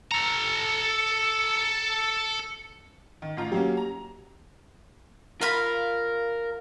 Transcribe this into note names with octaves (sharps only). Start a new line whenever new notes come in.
A4 A#5 C#7
D#3
A1 F4 A#5
F#3 A#3 C#4 G4
A#5
F4 A#4 F5 B5